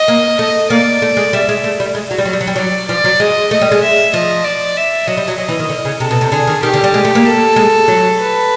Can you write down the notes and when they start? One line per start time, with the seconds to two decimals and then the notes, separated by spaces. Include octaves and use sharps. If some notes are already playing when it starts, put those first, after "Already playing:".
Already playing: D#5
0.08 A#3
0.39 A3 D#5
0.70 A#3 D5
1.02 A3
1.17 G#3
1.33 G3 E5
1.49 G#3
1.64 A3
1.80 G3
1.95 G#3
2.11 F#3
2.18 G3
2.25 F#3
2.33 G3
2.40 F#3
2.47 G3
2.56 F#3 D5
2.89 F3 D5
3.04 F#3
3.20 G#3 D#5
3.51 A3 D#5
3.61 G3
3.71 G#3
3.82 E5
4.13 F3 D#5
4.45 D5
4.76 E5
5.07 F#3 D#5
5.17 G3
5.28 F#3
5.38 F#3 D#5
5.48 E3
5.59 D#3
5.69 D3
5.85 C#3
6.00 C3 A4
6.10 B2
6.21 C3
6.32 D3 G#4
6.47 D#3
6.62 D#3 G4
6.74 D3
6.84 G3
6.94 G#3
7.05 A3
7.15 A#3
7.25 A4
7.56 G#3
7.88 F#3
8.18 B4